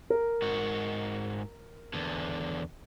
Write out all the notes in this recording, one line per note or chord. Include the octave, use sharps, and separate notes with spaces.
A#4
G#2 F#4
E2 D3